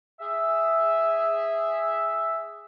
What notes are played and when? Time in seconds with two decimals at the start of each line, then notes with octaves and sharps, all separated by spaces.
0.21 G#4 E5